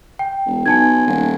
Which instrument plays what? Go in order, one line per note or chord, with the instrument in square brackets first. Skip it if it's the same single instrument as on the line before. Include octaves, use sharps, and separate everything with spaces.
[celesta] G5
[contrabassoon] E1
[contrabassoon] B1 [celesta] G#5 A5 G#6
[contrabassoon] D#1